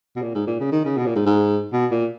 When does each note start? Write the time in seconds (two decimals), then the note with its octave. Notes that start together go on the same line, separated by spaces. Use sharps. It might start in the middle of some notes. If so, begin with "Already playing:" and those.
0.16 B2
0.22 A#2
0.35 G#2
0.47 A#2
0.60 C#3
0.72 D#3
0.85 C#3
0.97 B2
1.06 A#2
1.15 G#2
1.26 G#2
1.73 B2
1.91 A#2